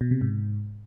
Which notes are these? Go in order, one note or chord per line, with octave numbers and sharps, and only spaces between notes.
B2
C3
G#2